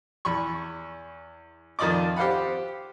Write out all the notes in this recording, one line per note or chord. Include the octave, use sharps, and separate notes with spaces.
E2 B5 C#6
F2 D#3 F4 D5 D#5 D6
G4 C5 F5 F#5 B5